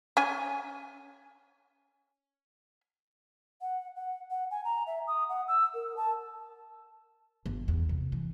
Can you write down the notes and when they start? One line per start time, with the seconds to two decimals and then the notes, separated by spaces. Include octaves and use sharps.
0.17 C#4 G#5
3.62 F#5
3.96 F#5
4.31 F#5
4.51 G#5
4.65 A#5
4.87 E5
5.08 D#6
5.29 F#5
5.48 E6
5.74 A#4
5.97 A5
7.46 G1
7.68 E2
7.89 C3
8.12 E3